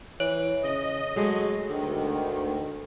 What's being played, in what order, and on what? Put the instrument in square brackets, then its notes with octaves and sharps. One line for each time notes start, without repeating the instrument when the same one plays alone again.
[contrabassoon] E3 [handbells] C#5
[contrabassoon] C#3 [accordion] D#5
[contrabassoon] F#3 [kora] G#3 A3
[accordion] D2 D#3 [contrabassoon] D3